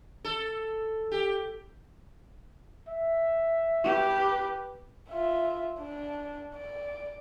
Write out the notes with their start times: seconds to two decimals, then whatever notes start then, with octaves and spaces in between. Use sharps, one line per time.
0.24 A4
1.12 G4
2.89 E5
3.84 G4 B4
5.09 F4 E5
5.79 D4
6.55 D5